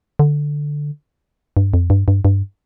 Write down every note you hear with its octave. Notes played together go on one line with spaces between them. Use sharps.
D3
G2
F2
G2
G2
G2